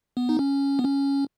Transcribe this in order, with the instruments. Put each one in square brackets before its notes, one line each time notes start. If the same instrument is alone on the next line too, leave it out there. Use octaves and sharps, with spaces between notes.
[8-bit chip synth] B3
D#4
C#4
B3
C#4